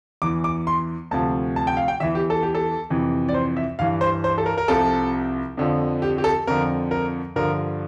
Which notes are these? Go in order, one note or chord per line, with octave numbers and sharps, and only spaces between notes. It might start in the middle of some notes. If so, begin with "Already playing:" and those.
E2 E3 D6
D6
C6
D2 C3 F3 A5
A5
G5
F5
G5
E2 E3 E5
G4
A4
G4
A4
F2 C3 E3
D5
C5
E5
G2 E3 F5
C5
C5
A4
A#4
A#4
C2 C3 F3 A4
F2 D3 F3
G4
G4
A4
F2 D3 F3 A#4
A#4
G2 D3 F3 A#4